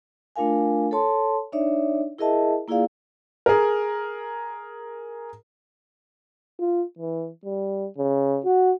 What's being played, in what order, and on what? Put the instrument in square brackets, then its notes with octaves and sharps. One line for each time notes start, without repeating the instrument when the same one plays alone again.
[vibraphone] A3 D4 F4 A#4 F5 G#5
A4 C#5 A5 C6
D4 D#4 C#5 D5 E5
E4 G#4 A#4 D#5 E5 A5
A#3 E4 F4 G#4 D5 F5
[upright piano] G#4 A#4
[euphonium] F4
E3
G3
C#3
F#4